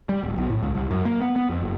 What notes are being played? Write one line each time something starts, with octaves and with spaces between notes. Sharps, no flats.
G3
D1
B1
A2
C#2
C2
F#2
A#3
B3
B3
F2
F#1